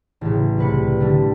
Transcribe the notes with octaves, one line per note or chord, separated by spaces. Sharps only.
A1 C#3
C2 B4 C#7
D3 G3